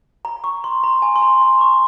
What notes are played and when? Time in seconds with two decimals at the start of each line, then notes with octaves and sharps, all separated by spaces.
0.25 A#5
0.44 C#6
0.64 C6
0.84 A#5
1.02 G#5
1.16 C6
1.22 A#5
1.42 C6
1.61 C#6